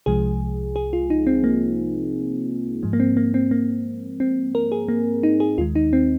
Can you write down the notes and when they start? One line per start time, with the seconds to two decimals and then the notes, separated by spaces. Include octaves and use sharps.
0.06 C2 C3 F3 G#3 G#4
0.76 G#4
0.93 F4
1.10 D#4
1.27 C4
1.44 A#3
2.83 G#2 F3 G#3
2.93 A#3
3.00 C4
3.17 A#3
3.34 C4
3.51 A#3
4.20 C4
4.55 A#4
4.72 G#4
4.88 A#3
5.23 D#4
5.40 G#4
5.58 D#2 D#3 G#3 F4
5.75 D#4
5.93 C4